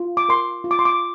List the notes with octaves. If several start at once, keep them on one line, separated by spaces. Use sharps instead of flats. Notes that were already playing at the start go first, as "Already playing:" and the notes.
Already playing: F4
D6
A#4 C6
F4
D6
C6
D6